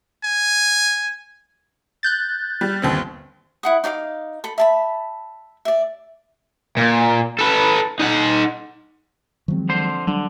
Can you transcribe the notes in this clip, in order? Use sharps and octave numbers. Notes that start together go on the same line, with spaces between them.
G#5
F#6 G6 A6
G3
G1 D#2 C4
E4 F#5 D#6
D#4 D5 F5 D6
A4 B5
E5 A5 B5
D5 E5
A#2
A4 B4
D#4 F#5
D#3 F3 F#3 G#3 C4
D3 C5 C6
D3 F#3 G3 D4